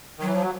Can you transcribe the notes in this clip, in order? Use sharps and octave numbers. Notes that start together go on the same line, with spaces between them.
D#3
E3 F#3
F3
F#3